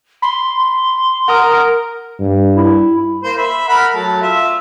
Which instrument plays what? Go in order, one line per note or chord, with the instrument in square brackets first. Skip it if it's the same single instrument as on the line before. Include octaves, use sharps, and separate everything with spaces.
[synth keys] B5 [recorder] C6
[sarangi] A#4 [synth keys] F#5 A#5 D#6
[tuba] G2
[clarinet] E4
[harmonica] A#3 C5
E5 B5
A#4 F#5 B5
F#3 A3 A5
F4 E5